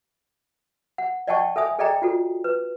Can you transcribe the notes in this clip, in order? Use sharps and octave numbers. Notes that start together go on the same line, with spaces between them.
F#5
D5 D#5 F#5 G5 A5 C#6
A4 E5 G#5 D#6
G#4 A4 D5 D#5 G5 A#5
F4 F#4 A4
B4